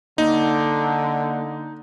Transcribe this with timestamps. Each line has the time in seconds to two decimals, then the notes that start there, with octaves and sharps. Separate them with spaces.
0.18 D3 A#3 D#4